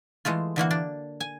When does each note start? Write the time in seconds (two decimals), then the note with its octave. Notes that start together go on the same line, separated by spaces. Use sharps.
0.25 E3 G#3 A3 F4
0.56 D3 E3 A#3 F#4
0.71 D4
1.20 G#5